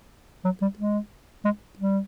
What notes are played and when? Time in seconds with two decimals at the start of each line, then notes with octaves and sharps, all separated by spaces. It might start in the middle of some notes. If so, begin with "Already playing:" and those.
0.45 F#3
0.62 G3
0.79 G#3
1.45 G#3
1.79 G3